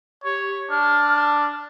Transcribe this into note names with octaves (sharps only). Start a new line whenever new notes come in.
G4 C#5
D4 F6